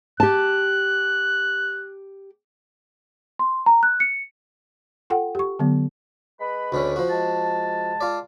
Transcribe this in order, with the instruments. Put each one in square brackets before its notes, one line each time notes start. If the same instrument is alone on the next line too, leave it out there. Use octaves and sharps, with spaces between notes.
[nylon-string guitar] G4 A5 [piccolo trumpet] F#6
[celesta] C6
A#5
F#6
C#7
[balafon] F4 A4 F#5 G5
G4 C#6
D3 F#3 B3
[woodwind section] G#3 B4 B5
[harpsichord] D2 D3 C#4
F3 F#4
[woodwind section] G#3 A5
[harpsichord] F4 D5